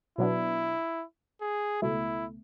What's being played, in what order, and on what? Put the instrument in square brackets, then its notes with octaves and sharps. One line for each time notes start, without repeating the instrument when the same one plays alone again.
[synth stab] B2 F#3 B3 D4 [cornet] E4
[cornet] G#4
[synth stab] C#2 B2 A3 [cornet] E4